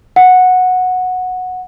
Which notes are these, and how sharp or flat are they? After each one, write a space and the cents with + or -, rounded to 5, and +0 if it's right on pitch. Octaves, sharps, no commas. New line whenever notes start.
F#5 -10